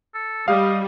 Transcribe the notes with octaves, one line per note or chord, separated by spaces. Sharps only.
A4
G3 D#5 F5